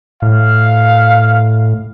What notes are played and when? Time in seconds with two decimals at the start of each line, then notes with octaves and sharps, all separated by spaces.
0.22 A2 F5